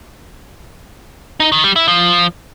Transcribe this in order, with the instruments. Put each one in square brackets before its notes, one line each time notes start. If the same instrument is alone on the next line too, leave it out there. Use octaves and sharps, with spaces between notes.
[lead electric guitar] D#4
D#3
G3
E4
F3